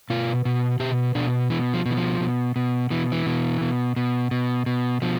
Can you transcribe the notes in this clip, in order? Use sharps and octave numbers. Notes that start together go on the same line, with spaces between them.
B2 F4
B2
B2 G4
B2 D4
B2 E3
F3
B2
E3
F3
B2
B2
B2 E3
E3
B2
B2
B2
B2
B2
B2 F3